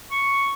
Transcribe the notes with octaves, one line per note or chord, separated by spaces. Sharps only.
C#6